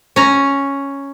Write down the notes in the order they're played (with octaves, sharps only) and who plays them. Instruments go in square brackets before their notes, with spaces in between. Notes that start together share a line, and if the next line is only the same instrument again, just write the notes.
[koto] C#4 A#5